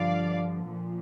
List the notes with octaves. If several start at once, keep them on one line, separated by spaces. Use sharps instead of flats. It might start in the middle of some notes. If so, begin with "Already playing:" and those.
Already playing: G2 D3 F3 D5 F5
A#2 F3